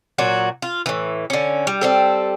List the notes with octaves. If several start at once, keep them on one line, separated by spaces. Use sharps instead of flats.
A#2 F#3 F#4
F4
A2 E3
D3 C#4
G3
G3 C4 A4